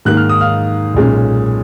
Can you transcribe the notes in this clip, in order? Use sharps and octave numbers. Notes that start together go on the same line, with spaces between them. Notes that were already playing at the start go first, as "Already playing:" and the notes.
G#2 D#3 A#3 F#6
F6
D#6
F5 F6
B1 A#2 G#3 C#4